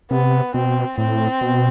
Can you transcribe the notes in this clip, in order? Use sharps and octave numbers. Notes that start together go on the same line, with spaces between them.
C3 B3
B2 C4
A2 C4
B2